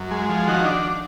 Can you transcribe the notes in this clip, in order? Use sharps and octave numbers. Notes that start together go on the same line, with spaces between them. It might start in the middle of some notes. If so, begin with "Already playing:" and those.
Already playing: F#2
G#3
F3
D#3 F#4
D4